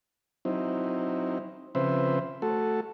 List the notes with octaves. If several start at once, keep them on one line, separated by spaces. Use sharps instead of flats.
F#3 C4 D#4 E4
C#3 F3 C4 B4 C5 E5
A3 F#4 A4